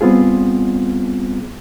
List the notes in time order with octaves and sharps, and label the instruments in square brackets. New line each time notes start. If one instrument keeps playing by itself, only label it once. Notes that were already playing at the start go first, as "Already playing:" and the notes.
[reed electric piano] G3 B3 C4 F4 G#4